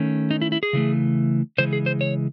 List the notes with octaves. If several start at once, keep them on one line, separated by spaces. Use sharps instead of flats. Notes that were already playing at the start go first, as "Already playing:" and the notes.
Already playing: D#3 A3 C#4
D#4
E4
E4
G#4
C#3 E3 A3
C#3 E3 G#3 C5
G#4
C5
C#5